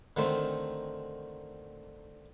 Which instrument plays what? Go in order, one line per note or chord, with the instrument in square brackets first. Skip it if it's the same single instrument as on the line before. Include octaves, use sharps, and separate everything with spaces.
[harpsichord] D3 D#3 A3 C4